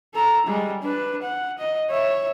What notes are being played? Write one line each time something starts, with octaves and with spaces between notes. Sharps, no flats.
A4 A#5
G3 G#3
D4 B4
F#5
D#5
C#5 E5